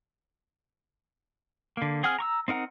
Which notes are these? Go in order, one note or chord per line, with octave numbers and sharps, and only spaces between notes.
D3 A#3
C4 G#4 F#5 G#5 F6
A#5 C#6 E6
C4 D#4 A#4 F#5 A#5